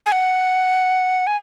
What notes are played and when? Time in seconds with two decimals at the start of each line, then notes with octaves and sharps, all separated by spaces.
0.06 G#5
0.12 F#5
1.27 G#5